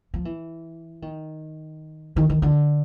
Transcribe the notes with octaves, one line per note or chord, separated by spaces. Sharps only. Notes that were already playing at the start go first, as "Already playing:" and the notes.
F3
E3
D#3
D#3
D#3
D3